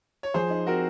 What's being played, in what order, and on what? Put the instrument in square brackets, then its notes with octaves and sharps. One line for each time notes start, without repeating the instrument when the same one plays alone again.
[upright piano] C#5
[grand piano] F3 [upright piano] G#4 C5
[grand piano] D#4
[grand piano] C4 [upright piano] F#4 A#4